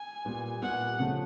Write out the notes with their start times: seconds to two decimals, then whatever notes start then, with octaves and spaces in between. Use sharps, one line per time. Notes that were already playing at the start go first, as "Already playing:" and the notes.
Already playing: G#5
0.25 A#2 G3 B3
0.62 A#2 G3 B3 F#5
1.00 C#3 F3 A3